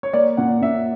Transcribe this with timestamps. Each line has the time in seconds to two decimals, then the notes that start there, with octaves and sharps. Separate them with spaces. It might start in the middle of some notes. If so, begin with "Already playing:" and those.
0.03 C#5
0.13 A#3 D5
0.37 A#2 F#5
0.62 A#2 E5